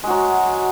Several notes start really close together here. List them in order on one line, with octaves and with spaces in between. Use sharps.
G#3 F#4 F#3